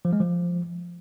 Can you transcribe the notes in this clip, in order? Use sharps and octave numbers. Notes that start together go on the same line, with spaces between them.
F3
G#3
F3